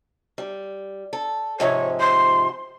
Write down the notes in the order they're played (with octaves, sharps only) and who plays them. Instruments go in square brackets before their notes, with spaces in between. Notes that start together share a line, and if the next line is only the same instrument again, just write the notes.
[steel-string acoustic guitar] G3
A4
[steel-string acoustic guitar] G#2 C3 F3 [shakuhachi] C#5
[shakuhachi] C6